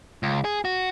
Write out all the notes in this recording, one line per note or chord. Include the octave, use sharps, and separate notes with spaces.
C#2
G#4
F#4